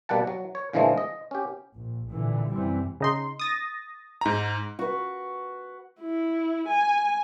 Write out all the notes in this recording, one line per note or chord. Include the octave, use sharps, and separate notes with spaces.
B2 G3 A#3 F#5 A5
F#3
C#5
A#2 D3 E3 F3 G#3 A3
D#5
C#4 G4
A#1
A1 A#2 D3 E3
F#2 C3 E3 G3 C4
C#3 D#4 C6
D#6 A6 A#6
G#2 A#5
F#4 B4
E4
G#5